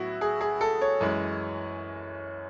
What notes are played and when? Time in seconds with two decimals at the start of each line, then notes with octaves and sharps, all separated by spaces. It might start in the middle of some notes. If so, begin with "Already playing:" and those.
Already playing: A2 F#3 B3 E4 F#4
0.21 G#4
0.41 G#4
0.61 A4
0.81 C#5
1.01 F#2 E3 G#3